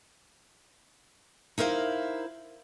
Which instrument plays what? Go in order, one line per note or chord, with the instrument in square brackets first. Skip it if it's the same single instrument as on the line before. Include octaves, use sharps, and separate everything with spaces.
[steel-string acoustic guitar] D#4 E4 A#4 C5 F5